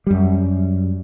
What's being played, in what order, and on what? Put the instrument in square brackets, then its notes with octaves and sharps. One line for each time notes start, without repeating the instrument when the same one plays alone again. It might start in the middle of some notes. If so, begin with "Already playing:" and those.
[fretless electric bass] F#2 G3